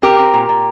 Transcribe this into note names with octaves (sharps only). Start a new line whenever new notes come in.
C4 G4 A#4
C4
A#2
A#2